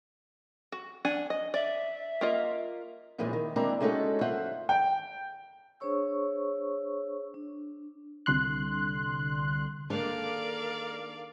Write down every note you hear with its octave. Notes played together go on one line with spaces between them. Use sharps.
F#4
D4 F#5 G#5
D#5
D5 E5
A#3 F4 D#5
F#2 A#2 E3 F3 G#3 D#4
D#3
G#3 A#3 C4 D4 E4 A#5
G#3 A3 C#4 D#4 F#4 A4
F#2 F4 C5 E5 F#5
G5
D4 G#4 C5 C#5 C#6 E6
D4
C2 D3 C6 F#6
D#3 G#3 A#3 D4 A4 A#4 D5 F5